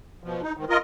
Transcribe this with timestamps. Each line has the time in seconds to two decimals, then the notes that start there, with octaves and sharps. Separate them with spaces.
0.24 B2 F3
0.43 D#4
0.57 G#2 D#3
0.69 F4 A#4 D#5